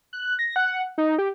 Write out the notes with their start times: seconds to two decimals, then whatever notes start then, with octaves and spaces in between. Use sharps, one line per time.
0.13 F#6
0.39 A#6
0.56 F#5
0.98 D#4
1.18 G4